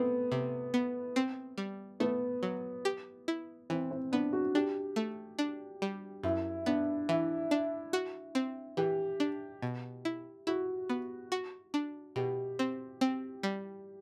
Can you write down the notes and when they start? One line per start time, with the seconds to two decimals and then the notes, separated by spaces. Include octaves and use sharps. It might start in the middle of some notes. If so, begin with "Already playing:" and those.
Already playing: A3 B3 C4
0.32 C3
0.74 B3
1.16 C4
1.58 G3
2.00 A3 B3
2.43 F#3
2.85 G4
3.28 E4
3.70 E3 C4
3.91 C4
4.12 B3 D4
4.33 F#4
4.55 D4 G4
4.96 A3
5.39 D4
5.82 G3
6.23 F#2 E4
6.66 B3 D4
7.09 E3 E4
7.51 D4
7.93 F#4
8.35 C4
8.77 E3 G4
9.20 D4
9.62 B2
10.05 E4
10.47 E4 F#4
10.89 B3
11.32 F#4
11.74 D4
12.16 B2 G4
12.59 C4
13.01 C4
13.43 G3